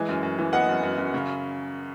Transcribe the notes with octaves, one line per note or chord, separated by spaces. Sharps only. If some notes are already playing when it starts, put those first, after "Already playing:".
Already playing: E3 G#3
F#2
F#2
E3
B3 D#5 F#5
F#2
F#2
F#2
C#3